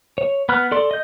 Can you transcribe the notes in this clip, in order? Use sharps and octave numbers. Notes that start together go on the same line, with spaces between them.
C#5
B3 B5 F6 F#6
A4 D5 C6
D#5 G6